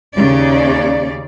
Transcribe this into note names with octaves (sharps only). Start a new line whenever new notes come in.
D#2 C#3 C#4 D5